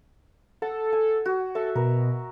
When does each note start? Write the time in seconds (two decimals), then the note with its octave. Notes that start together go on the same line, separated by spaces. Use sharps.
0.62 A4 F#5
0.93 G#5
1.25 F#4
1.55 A4 E5
1.76 B2 A#4